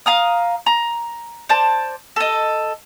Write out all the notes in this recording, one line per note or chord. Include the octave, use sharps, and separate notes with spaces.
F5 A#5 D#6
A#5
C5 D5 A5
A4 D#5